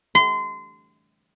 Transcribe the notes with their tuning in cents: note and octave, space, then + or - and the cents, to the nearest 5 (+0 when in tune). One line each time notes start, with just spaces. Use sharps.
C6 -30